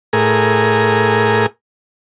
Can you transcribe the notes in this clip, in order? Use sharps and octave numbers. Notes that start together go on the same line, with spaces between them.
A2 G#4 A#4